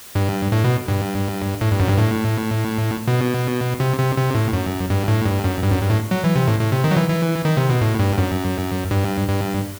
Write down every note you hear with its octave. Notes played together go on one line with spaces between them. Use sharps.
G2
A2
B2
G2
A2
G2
F#2
G2
A2
B2
C3
C3
C3
A2
F#2
G2
A2
G2
F#2
G2
F#2
G2
A2
F#3
E3
C3
A2
A2
C3
D#3
F#3
E3
E3
D#3
C3
B2
A2
G2
F#2
G2
G2